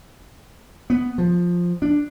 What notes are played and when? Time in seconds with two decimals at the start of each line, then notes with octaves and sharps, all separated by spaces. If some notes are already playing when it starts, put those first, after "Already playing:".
0.90 B3
1.18 F3
1.82 D4